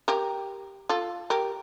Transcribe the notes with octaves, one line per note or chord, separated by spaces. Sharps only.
G4 A#4
F4 A4
G4 A#4